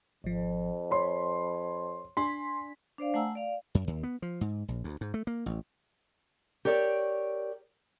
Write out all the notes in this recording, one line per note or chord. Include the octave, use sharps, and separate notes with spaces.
G#1 F2 F3
C#5 B5 C6
D4 G#5 C6 B6
D4 C5 D5 F5
A3 F#5 G#5 A#5 E6
D5 F5
F#2
D#2
B3
F3
G#2
A#1
D2
G#2
A3
A#3
A1
G4 A#4 C#5 D5 E5